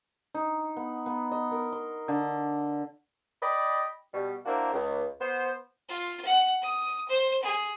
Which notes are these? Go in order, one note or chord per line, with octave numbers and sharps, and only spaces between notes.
D#4
B3
B3
D#5
A#4
C6
D3
D5 D#5 G5 B5
B2 G3
A#3 D4 E4 F#4 A#4 C5
C#2
B3 C5
F4
F#5
D#6
C5
G#4